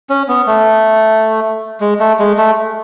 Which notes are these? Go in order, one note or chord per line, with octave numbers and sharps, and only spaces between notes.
C#4
B3
A3
G#3
A3
G#3
A3